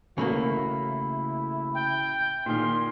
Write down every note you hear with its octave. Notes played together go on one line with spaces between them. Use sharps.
A1 C#3 A3 A#3 E4 F#4 B5
G5
A#2 D#3 G#4 C6 F6